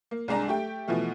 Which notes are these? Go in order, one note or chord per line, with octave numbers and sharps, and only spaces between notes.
A#3
C2 G#3 D4 A#5
A3 G4 G5
B2 E3 F3 A3